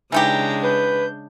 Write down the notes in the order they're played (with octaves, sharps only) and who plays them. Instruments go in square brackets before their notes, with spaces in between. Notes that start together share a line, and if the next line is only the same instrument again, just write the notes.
[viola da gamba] C#3 G#3 D4 [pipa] E3 D#4 G4 [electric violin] G5 A#5
[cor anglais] B4 [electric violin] G6